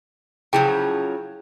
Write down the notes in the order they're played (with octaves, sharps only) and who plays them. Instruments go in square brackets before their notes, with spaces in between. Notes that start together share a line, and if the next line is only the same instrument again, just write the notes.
[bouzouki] C#3 F3 F#3 [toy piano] E4 G#4 G5